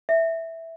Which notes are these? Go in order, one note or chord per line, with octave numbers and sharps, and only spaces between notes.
E5